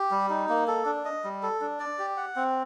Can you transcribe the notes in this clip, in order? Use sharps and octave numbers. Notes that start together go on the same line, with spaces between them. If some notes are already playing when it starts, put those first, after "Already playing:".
Already playing: G4
G3
D#4
A#3
A4
D4
D#5
G3
A4
D4
D5
G4
F#5
C4